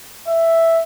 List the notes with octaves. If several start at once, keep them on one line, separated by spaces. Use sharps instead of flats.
E5